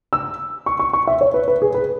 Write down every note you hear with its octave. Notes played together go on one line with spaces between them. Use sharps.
E6
C#6
C#6
C#6
E5
C#5
B4
B4
G#4
B4